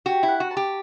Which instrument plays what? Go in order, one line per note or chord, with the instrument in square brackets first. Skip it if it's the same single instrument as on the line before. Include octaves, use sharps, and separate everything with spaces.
[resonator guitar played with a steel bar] F#4 [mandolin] G4
[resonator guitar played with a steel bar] E4
[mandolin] F#5
[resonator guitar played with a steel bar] F#4
[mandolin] A5
[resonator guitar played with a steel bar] G4